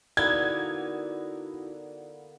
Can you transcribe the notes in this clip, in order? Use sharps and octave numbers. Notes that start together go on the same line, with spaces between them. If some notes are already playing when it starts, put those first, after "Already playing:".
D3 A#3 B3 D#4 E4 F#4 G#6